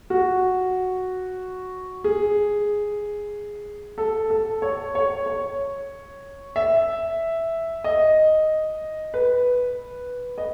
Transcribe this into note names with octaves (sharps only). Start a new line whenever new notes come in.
F#4
G#4
A4
A4
C#5
C#5
C#5
E5
D#5
B4
D#5